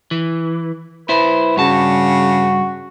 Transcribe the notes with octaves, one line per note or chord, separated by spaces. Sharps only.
E3
E4 B4 C5
G2 C#3 F#4 A5